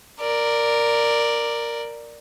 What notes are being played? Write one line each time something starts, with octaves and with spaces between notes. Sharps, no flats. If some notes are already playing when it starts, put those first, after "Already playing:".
A#4 D5